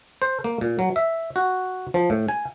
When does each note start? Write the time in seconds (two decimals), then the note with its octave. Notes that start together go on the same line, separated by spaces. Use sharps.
0.22 C5
0.44 A#3
0.61 A#2
0.79 F#3
0.96 E5
1.36 F#4
1.94 F3
2.10 A2
2.28 G#5